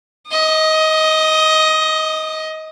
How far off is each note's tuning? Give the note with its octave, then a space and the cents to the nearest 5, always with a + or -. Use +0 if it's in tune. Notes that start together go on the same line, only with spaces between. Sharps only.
D#5 +15 D#6 -25